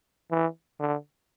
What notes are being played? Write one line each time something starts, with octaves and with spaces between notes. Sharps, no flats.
E3
D3